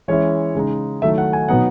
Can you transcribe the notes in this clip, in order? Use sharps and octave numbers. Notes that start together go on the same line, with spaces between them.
E3 G#3 C#4 E4 C#5
C#3 G#3 D#4
D#3 F#3 A3 E4 E5
F#5
G#5
B2 F#3 B3 D#4 F#5